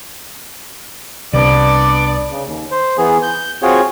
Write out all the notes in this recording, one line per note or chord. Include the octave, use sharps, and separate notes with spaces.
C2 B3 D4 D5
C#3
D#2
C5
E3 B3 G#4
G6
C4 F4 F#4 G#4 C#5